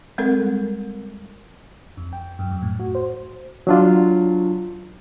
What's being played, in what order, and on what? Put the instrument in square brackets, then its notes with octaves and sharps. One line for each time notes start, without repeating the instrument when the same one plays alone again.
[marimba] G3 G#3 C4 A4 A#4
[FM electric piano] F2
G5
F#2
F2
A2
F#4
C5
[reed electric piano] F#3 D4 F4